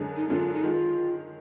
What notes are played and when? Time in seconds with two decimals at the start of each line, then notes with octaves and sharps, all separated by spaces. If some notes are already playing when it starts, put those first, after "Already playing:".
Already playing: F#2 D3 G#3
0.16 D#4
0.28 F#2 D3 G#3 F4
0.54 D#4
0.63 D#3 G#3 F4